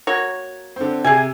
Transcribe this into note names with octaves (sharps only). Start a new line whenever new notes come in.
A#3 F#4 C#5
D3 C4
C3 G#4 G#5